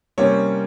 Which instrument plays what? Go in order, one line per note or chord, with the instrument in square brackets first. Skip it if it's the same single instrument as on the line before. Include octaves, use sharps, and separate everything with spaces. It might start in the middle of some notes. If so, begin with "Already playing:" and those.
[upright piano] C3 G3 A#3 C#4 C#5